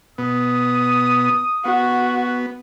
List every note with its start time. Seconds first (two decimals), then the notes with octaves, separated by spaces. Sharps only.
0.18 B2 B3 D#6
1.65 B3 F#4